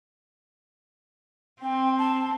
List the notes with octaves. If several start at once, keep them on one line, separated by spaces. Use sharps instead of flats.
C4 G5
A5